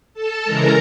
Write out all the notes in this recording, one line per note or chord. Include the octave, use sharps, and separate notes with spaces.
A4 A5
C#3 E3 G#3 A#4 A#5